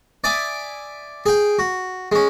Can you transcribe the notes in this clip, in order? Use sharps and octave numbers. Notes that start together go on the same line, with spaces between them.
D5 E5 G#5 D6 D#6
G#4 G5
F#4
G#3 C#4